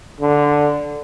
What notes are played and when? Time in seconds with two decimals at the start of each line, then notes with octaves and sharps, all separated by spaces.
0.20 D3